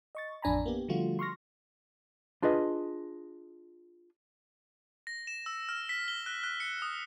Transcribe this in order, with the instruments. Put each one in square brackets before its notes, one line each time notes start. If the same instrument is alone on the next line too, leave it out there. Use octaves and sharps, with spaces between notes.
[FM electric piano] D#5 C#6 A6
A1 F2 D4 G#5 A#5 B5
A#3 B3 G4
D3 F3 G3 A3 F4 F#4
C6 C#6 F6 A#6
[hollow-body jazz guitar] D4 F4 G#4 B4 D#5
[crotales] A#6
E7
E6
F6
B6
G7
F#6
F#6
C#7
D#6